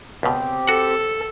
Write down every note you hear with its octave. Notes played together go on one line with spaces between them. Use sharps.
C#2 B2 C4 G4
F#4 A4 F#5